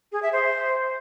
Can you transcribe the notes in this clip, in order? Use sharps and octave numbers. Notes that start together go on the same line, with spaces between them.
G#4
E5
C5